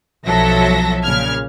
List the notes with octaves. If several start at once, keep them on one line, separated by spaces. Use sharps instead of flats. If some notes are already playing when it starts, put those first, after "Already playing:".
B1 F3 F#3 A4 E5 A#6
A#2 C#3 F6 G#6